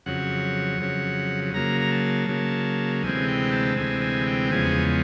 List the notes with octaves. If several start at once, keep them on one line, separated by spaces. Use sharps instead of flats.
F2 C#3 F#3 F#5
F2 C#3 F#3
C#3 F#3 A#3 A#5
A#5
A5
C#3 F#3 A#3
D2 C3 E3 G#3 C4 G#5
G5
A5
D2 C3 E3 G#3 C4 G#5
G#5
G5
E2 C#3 F3 G#3 B3 G#5